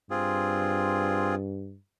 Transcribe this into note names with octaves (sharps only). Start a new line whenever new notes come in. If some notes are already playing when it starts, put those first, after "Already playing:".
G2 C4 F4 G#4